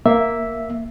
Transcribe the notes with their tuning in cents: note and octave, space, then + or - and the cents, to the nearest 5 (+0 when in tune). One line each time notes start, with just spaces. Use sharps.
A#3 +0 E5 +0